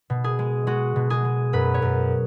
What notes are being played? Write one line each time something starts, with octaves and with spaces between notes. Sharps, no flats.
B2
G#4
G#3
G#3 F#4
B2
G#4
G#3
F#2 B4
C#5
F#2